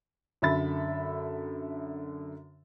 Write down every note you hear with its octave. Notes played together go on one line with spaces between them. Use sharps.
F#2 D3 A4 E5 B5 A6